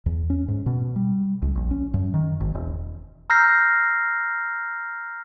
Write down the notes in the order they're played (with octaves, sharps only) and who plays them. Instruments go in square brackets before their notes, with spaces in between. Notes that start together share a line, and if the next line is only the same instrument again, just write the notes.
[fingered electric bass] E2
C#4
G#2
B2
G3
C#2
A#1
C#4
F#2
D#3
G#1
E1
[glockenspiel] A#5 E6 F6 G6 A#6 C7